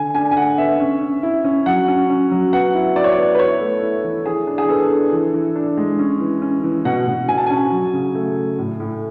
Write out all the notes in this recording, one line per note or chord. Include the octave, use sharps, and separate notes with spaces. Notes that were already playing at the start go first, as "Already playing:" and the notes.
Already playing: D3 G#5
D4 G#5
G#5
D3 F#5
B3 E5
C#4
C#4
E4
C#4
F#3 F#5
C#4
C#4
F#3
B3 F#5
E4
E4 D5
C#5
D5
B3
B4
E4 C#5
A3
E4
E3
E3 G#4
D4
G#4
B3 A4
D4
E3
E3
D4
G#3
C#4
E3
C#4
E3
B2 F#5
B2
B2 G#5
A5
C#4 G#5
F#3
C#3
A3
A3
A2
A2